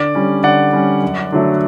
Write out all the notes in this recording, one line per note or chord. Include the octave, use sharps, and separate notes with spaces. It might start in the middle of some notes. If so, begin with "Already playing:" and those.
Already playing: D3 D5
G3 C#4
D3 D5 F#5
G3 C#4
F#2
D3 F#3 A3